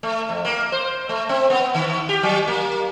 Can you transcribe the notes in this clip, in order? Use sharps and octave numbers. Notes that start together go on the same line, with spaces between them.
A3
F2
A#3
C5
A3
C4
B3
D#3
G4
F#3
A#3